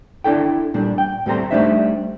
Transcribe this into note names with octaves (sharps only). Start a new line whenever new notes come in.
D4 E4 A4 G5
A#2 G3 D4
G5
A2 G3 A3 C4 A#5 C6
G3 A3 D4 D#4 C5 E5